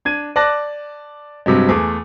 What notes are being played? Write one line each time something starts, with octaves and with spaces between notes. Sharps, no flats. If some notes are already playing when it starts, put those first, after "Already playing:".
D4 G#6 D#7
D5 A5 D6 F#6 A#6
G2 C3 F#3 G#3
E2 A3 G#4 D6